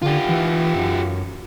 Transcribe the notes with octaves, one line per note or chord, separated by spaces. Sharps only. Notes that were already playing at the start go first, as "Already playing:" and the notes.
D3 F4 G4
E3
F#2